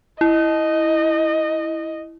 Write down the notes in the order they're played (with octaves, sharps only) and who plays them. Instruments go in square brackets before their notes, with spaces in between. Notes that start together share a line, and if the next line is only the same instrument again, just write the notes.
[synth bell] E4 [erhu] D#5